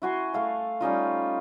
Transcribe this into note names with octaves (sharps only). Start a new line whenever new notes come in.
E4 F#4 G#5 C6
A3 F5 A5
G3 C#4 D#4 F4